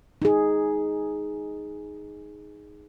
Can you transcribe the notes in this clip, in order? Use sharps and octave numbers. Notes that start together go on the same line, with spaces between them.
D#4 G#4